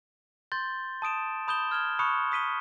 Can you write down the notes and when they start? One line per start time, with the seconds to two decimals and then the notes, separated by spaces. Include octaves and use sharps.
0.52 C6 G6 A6 G7
1.02 A5 D#6 D7 E7
1.48 B5 D#6 G6 E7 G7
1.71 F6 G#6 E7 G7
1.99 A5 B5 C#6 D#6 F#6 C#7
2.32 D#6 B6 D#7 G7